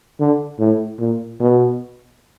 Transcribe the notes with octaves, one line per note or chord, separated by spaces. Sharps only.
D3
A2
A#2
B2